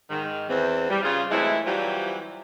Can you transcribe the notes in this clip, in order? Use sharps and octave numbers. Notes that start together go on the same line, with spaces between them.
G#2 D#3
E2 C4
G3
C#3 F4 G#4
E3 F#3 G#3 A3 C4 E4
E3 F#3 G3 C4 E4 F4